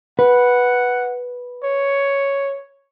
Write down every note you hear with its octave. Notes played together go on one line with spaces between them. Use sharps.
B4 F#5
C#5